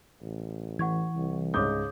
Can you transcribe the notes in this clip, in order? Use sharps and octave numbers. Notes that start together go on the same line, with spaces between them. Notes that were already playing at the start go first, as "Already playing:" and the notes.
A1
E3 F#5 C#6 G#6
C2
C#2 G#2 C#5 D6 D#6 G6